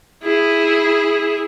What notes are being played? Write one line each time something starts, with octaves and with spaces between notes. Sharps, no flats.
E4 G#4